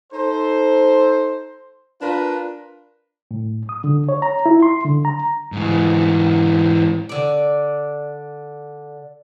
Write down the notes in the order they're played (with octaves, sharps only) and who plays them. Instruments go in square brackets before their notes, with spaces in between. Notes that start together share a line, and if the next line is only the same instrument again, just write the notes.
[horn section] D#4 A4 C5
D4 F4 A#4 B4
[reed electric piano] A2
D#6
D3
C#5
A#5
E4
C6
D3
A#5
[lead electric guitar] G#2 E3
[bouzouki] D3 D5